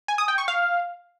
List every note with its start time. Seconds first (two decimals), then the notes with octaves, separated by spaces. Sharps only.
0.08 G#5
0.18 D#6
0.28 G5
0.38 C#6
0.48 F5